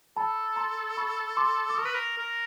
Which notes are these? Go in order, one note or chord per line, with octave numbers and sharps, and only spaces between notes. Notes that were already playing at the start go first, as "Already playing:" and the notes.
A4 A5 B5
A#5 C6
B5 C#6
C6 D6
D6
A#4 C#6 D#6
B4
A#4
A#4